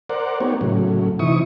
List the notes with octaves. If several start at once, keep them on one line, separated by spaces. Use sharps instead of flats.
A#4 C5 D5 F#5
A#3 B3 D#4 G4 C#5
A2 C#3 F#3
C3 E3 D#4 E4 C#6 D#6